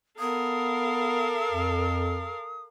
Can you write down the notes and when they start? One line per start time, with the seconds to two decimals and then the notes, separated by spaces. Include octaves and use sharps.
0.19 B3 A4 A#4 F5 D#6
1.51 F2